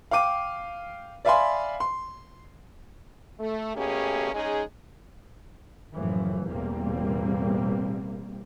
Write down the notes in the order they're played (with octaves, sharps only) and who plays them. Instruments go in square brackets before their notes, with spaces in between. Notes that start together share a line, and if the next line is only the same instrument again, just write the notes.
[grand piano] F5 G5 D6 D#7
D5 E5 F5 G#5 B5 C6
C6
[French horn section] A3
B2 A3 A#3 C#4 G4 G#4
G#3 C#4 D#4 G#4
[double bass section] F#1 F#2 A2 E3 F3
A1 E2 B2 G3 A#3 C4